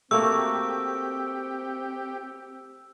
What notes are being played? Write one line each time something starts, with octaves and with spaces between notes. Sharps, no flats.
A3 A#3 C4 F#4 G4 E6